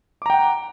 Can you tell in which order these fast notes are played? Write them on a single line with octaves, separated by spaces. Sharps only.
D6 A#5 G5 F#5